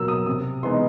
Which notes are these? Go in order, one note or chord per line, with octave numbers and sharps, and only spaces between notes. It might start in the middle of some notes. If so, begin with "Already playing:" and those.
Already playing: B2 F#3 A#3 E6
D#6
C3 D#6
E3 G#3 B3 D#4 C6